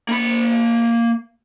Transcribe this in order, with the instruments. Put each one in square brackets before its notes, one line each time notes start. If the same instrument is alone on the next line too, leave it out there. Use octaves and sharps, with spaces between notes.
[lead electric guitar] A#3 B5